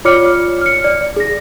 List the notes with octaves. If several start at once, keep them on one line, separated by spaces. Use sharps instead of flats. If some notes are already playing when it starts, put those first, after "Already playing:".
F4 C#5 D5 D6 F6 C#7
F6 C#7
D5
G#4 A#6